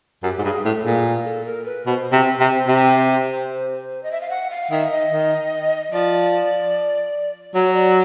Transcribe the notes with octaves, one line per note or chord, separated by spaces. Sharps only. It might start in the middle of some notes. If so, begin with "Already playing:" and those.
F#2 G4
G#2
G2 G#4
A2 A4
A#2 G#4
A4
A#4
B4
B2 C5
C3
C3
C3
D#5
E5
F5
F#5
F5
D#3 E5
D#5
D#3
F3 D5
F#3 C#5
D5